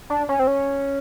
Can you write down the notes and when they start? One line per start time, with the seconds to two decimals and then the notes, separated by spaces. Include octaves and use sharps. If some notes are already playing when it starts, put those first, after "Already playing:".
0.10 D4
0.29 C#4
0.39 C4
0.47 C#4